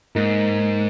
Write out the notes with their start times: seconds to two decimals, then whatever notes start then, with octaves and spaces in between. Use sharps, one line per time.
0.15 G#2 A#3 D#4